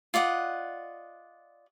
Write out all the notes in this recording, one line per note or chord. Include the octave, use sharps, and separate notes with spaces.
F4 D5 D#5 F#5